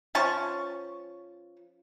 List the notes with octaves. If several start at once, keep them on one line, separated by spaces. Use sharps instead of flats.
F3 C#4 A5 C#6